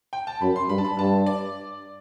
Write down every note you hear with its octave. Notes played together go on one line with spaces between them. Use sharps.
G5
A5
F#2 B5
C6
G2 B5
A5
B5
G2 A5
D5